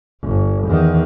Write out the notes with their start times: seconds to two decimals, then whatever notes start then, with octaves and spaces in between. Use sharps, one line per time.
0.23 G1
0.68 E2 D#3